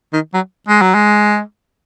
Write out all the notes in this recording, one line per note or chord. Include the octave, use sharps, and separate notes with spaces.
D#3
F#3
G#3
F#3
G#3